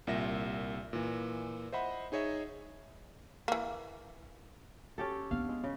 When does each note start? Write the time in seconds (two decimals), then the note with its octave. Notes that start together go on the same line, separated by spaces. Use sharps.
0.07 C2 A#2 E5 A#6
0.93 A#2 E3
1.72 C5 D#5 E5 F#5 B5
2.12 D#4 G#4 C#5 D#5 E5
3.48 E3 A#3
4.98 C#4 G4 A4
5.31 B3 D4 F5
5.49 G#3
5.64 C#3